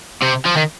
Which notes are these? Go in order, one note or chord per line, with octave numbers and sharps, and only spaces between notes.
C3
F3
D#3